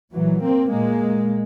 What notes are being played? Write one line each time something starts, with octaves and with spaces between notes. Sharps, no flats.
A#2 E3 F#3
A#3 C4
A#2 G#3 A#3